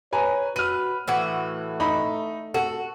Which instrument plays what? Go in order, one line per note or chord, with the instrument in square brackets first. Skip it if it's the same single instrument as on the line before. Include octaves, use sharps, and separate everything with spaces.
[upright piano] B4 G#5 A#5 [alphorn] C#5
[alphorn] F#4 [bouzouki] B4 [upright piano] F6 D#7
[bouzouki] A2 E3 F#4 [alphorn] A3
[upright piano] D#4 B5
[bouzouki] F#4 [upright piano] A4